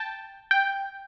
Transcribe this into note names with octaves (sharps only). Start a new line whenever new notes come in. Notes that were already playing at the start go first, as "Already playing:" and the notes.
Already playing: G5 A5
G5